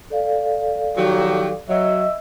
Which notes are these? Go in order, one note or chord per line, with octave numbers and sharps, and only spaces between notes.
A4 D5 F5
D#3 F3 F#3 G4
F#3 D#5 E5